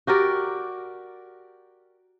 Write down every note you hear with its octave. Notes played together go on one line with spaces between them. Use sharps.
F#4 G4 A#4 D5